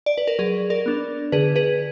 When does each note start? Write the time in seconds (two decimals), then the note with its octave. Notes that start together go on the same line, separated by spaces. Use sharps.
0.06 D5
0.18 B4
0.28 A#4
0.39 F#3 G#4
0.70 A#4 D5
0.86 B3 D4
1.32 D3 G#4 B4
1.56 G#4 B4